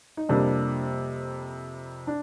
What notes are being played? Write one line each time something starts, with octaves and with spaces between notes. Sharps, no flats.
D#4
F2 C3 G3 A#3 D4
D4